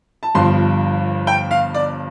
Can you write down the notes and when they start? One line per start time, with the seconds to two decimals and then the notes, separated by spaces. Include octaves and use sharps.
0.23 A5
0.35 G1 G2 F3 C6
1.27 G5
1.51 F5
1.75 D5